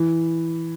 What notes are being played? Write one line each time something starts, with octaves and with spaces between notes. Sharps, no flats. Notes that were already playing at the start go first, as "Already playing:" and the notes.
Already playing: E3